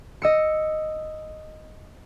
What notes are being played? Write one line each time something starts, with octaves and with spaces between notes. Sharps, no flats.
D#5 E6 C#7